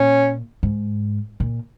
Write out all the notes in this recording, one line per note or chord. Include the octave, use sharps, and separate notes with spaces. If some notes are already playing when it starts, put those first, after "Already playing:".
Already playing: A#2 C#4
G#2
A#2